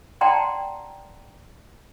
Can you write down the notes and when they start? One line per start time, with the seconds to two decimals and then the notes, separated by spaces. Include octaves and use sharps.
0.21 D5 F#5 G5 A5 A#5 C6